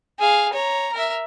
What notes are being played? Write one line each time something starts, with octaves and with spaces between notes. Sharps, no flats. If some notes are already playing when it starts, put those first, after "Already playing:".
G#4 F5
C#5 A#5
A#4 E5